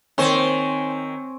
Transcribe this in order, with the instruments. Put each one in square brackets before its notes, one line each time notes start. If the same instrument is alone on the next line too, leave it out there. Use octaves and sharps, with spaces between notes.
[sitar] D#3 C5 [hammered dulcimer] C4 C#5 G#5